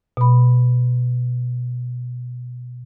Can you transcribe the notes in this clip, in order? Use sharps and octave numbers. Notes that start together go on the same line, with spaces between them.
B2 B5